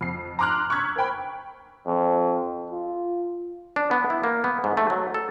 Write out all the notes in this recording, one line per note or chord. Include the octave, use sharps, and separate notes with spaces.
F2 C7
A#5 C6 D6 F6 F#6
C#6 E6 F#6 G#6 B6
A#4 C5 G5 B5
F2
F4
D4
B3
E4
A#3
B3
G#2
A3
F#3
A4